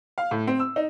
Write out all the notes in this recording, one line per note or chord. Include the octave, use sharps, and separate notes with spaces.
F5
A2
C4
E6
D#4